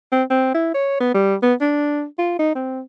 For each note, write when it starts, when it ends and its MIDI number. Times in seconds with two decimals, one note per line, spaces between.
0.12 0.23 60
0.30 0.54 60
0.55 0.72 64
0.74 1.00 73
1.00 1.14 59
1.14 1.35 55
1.42 1.54 59
1.61 2.04 62
2.19 2.34 65
2.39 2.54 63
2.55 2.81 60